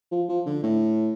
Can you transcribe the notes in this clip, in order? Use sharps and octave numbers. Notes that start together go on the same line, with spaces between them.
F3
F3
D3
A2